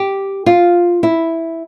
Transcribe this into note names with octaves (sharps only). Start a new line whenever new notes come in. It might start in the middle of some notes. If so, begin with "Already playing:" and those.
Already playing: G4
F4
E4